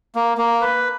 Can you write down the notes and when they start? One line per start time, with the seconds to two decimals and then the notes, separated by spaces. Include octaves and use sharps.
0.15 A#3
0.38 A#3
0.61 B4